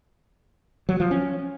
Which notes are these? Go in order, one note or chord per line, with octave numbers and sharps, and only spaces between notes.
F#3
F3
C#4